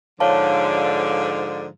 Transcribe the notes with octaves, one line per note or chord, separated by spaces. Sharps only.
G#2 D3 F3 C#5 F5 A5